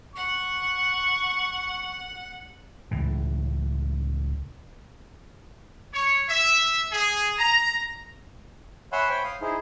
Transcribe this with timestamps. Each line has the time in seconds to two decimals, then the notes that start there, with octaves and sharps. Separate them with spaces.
0.16 F#5 C#6
2.91 C#2 A2 E3
5.93 C#5
6.28 E5
6.91 G#4
7.38 A#5
8.92 C#5 E5 F#5 G#5 B5 C6
9.09 C5 C#5 G5 B5
9.24 F5 D#6
9.41 D#4 E4 G#4 C5